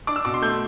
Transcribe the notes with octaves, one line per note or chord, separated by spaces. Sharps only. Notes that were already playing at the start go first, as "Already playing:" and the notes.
D4 D6
E6
B2 D6
C6
A3 G6